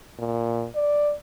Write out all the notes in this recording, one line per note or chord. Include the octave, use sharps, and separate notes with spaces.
A#2
D5